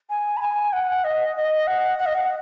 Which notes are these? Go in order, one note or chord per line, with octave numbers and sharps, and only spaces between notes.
G#5
B5
G#5
F#5
D#5
D#5
F#5
F#5
D#5
F#5